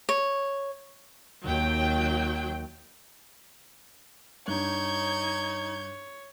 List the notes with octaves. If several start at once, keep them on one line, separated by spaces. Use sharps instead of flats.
C#5
D#2 D#3 F#3 G5
G2 D#4 C#5 G6 G#6